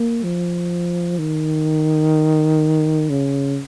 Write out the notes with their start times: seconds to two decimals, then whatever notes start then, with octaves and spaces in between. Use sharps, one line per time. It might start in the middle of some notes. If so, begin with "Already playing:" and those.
Already playing: A#3
0.24 F3
1.19 D#3
3.10 C#3